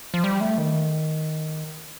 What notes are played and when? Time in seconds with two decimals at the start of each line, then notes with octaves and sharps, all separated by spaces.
0.14 F3
0.24 G3
0.41 A3
0.58 D#3